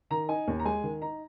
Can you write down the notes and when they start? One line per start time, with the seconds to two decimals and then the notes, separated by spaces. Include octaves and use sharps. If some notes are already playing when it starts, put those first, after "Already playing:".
0.10 D#3 A#5
0.29 D#4 G#5
0.48 D#2
0.59 A#5
0.65 G#3 G#5
0.83 D#3
1.02 D#4 A#5